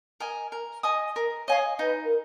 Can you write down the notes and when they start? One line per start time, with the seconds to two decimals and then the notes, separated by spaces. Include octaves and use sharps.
0.20 A#4 D#5 G#5
0.52 A#4
0.83 D#5 G#5 D#6
1.16 A#4
1.47 C#5 D#5 F5 G#5 D#6
1.79 D#4 B4 D#5
2.04 A#4